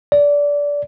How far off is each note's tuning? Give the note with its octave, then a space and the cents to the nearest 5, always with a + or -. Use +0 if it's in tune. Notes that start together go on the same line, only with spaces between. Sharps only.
D5 -20